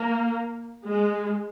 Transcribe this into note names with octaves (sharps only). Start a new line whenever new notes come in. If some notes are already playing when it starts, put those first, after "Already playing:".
Already playing: A#3
G#3